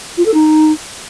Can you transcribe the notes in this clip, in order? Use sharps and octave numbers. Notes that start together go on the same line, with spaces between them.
F4
A4
D#4